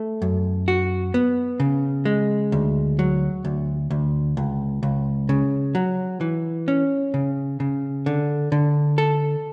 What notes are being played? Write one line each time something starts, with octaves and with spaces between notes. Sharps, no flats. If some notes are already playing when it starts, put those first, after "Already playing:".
Already playing: A3
F#2
F#4
B3
C#3
G#3
D2
F#3
D2
D2
C#2
C#2
C#3
F#3
E3
C#4
C#3
C#3
D3
D3
A4